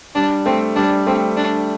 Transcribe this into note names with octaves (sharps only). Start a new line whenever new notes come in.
G3 D4
A3 C4
G3 D4
A3 C4
D4